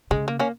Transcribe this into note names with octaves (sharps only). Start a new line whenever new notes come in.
C#3 G#3
A#3
A#3 C#4